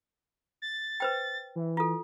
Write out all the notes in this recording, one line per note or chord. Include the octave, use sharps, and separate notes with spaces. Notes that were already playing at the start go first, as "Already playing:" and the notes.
A6
B4 C5 G5
E3
F4 A4